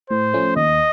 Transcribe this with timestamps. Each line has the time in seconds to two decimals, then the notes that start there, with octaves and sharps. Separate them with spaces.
0.10 A2 C5
0.33 F3 A3 C#4
0.57 D#2 D#5